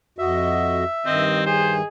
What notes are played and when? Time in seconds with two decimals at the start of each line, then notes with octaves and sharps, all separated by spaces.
0.19 F2 F#4 D#5 E5
1.06 G2 D#3 C4 D#5
1.46 G#4 C5